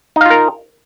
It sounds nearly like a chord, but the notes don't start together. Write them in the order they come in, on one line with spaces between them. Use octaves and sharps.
D#4 F5 F4 A#4